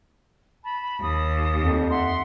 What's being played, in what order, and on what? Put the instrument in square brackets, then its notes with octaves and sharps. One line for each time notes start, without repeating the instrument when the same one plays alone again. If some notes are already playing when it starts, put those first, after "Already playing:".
[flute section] A5 B5
[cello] D#2 [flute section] D#6
[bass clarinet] F2
[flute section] E5 F#5 C6